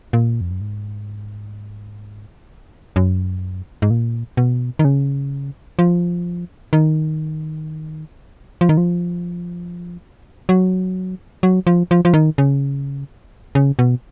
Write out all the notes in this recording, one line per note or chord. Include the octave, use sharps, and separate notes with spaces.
A#2
F2
F#2
G#2
F#2
G#2
A#2
B2
D#3
C#3
F3
D#3
F3
D#3
F3
F#3
F#3
F3
F3
F3
D#3
C#3
C#3
B2